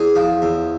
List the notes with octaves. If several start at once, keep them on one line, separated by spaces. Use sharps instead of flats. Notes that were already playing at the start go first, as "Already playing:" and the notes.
Already playing: E2 G#4
F3
E2